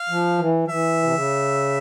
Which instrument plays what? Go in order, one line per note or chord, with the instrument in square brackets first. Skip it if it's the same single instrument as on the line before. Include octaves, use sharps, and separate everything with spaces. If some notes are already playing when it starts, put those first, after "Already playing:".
Already playing: [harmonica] F5
[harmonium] F3
E3
F3
[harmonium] E3 [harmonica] E5
[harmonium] C3
C#3